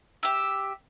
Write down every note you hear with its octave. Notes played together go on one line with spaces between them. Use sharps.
G4 E5